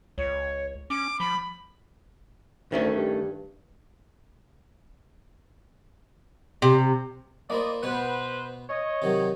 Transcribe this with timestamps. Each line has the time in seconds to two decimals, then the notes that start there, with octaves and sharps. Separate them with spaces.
0.18 C#2 C#5
0.90 C#4 D6
1.20 F3 B5
2.72 D2 D#3 A3 C#4
2.96 G2
6.62 C3
7.50 A#3 E4 C5 D5 D#5
7.83 B2 B3 B4 C5 F#5
8.70 C#5 D#5
9.02 C3 D#3 F#3